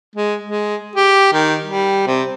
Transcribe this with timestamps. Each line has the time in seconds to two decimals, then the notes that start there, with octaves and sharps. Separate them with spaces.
0.16 G#3
0.44 G#3
0.96 G4
1.33 D#3
1.66 G3
2.07 C3